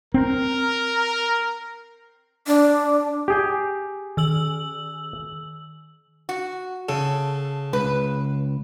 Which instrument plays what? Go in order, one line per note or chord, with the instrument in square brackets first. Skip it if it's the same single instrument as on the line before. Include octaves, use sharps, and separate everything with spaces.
[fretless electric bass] C4 [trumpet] A#4
[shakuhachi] D4
[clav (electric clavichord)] G4 G#4 G5
[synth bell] D#3 E6 F#7
[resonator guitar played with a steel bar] F#4
[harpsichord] C#3 [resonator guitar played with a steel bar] A4
[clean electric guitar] C#2 [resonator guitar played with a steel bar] B4